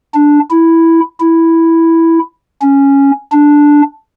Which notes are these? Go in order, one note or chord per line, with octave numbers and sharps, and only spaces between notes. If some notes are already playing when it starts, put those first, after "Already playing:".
D4
E4
E4
C#4
D4